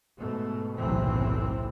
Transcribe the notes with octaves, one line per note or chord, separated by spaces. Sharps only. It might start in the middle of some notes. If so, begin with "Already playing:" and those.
G#2 B2 A3
F#1 B1 A2 C3 E3 C4